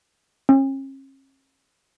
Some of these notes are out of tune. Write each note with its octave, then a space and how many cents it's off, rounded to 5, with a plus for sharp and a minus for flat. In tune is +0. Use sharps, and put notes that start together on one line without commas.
C#4 -40